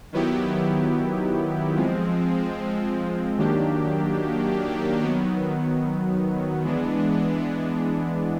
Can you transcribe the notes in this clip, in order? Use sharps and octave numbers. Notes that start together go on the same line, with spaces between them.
D#3 F#3 B3 E4 G4
F3 G#3 C4
D#3 F#3 A#3 D4 G4
D#3 F#3 B3
E3 G#3 B3 D4